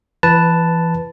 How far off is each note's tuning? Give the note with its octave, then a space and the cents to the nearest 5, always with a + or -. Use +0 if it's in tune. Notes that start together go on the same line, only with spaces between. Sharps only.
E3 +25 B4 +0 A5 +0